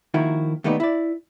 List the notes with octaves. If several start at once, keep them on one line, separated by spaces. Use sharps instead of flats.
D#3 F3 A#3 E4 F#4
D#2 A3 B3 D#4 D5
E4 D5